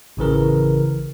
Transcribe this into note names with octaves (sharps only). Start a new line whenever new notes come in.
A1 C#3 E3 A#4